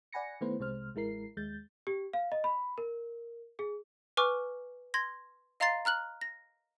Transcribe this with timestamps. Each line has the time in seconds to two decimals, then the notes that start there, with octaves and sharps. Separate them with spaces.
0.13 D5 F#5 G#5 B5 A#6 C#7
0.41 D#3 A3 B3 E4 B4 C5
0.59 C2 C3 G#3 C5 F6
0.95 A1 G#3 E4 A#4 C7
1.37 D#2 G#3 G6 A6
1.87 G4
2.13 F5
2.32 D#5
2.44 B5
2.78 A#4
3.59 G#4
4.17 B4 G#5 C#6 D6 F6
4.94 C6 G#6 A#6
5.60 D#5 F5 A#5 C6 A6 C7
5.85 A#5 F6 F#6 F#7
6.21 A#6